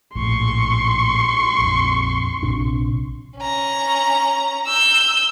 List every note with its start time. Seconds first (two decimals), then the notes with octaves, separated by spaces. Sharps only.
0.15 A#1 A2 C6 C#6
1.58 A#1 F2
2.43 A#1 C3 D4
3.39 C#4 A#5
4.66 E6 G6